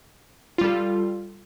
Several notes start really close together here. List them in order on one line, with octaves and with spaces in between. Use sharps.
F4 G3 A4